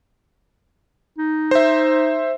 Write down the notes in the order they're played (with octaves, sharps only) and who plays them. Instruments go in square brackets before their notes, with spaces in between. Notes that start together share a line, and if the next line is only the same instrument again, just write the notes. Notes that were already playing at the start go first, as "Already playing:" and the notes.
[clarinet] D#4
[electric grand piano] C5 E5